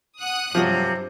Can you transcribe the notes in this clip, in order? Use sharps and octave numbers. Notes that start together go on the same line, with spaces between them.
F#5 D#6 F#6
G2 C3 F3 F#3